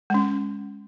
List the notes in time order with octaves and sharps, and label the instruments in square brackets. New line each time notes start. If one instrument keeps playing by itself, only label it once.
[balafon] G#3 C#4